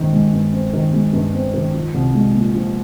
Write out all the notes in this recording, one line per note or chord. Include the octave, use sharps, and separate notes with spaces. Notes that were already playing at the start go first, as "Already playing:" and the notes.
Already playing: G2 D#3 G#3 C4
G#3
G2
C4
D#3
G#3
G2
C4
D#3
F3
C2
G#3
A#2
F3